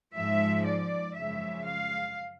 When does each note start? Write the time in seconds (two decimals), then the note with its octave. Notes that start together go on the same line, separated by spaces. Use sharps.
0.16 G#2 F3 G#3 E5
0.66 D5
1.15 F#2 C#3 F3 G#3 E5
1.64 F5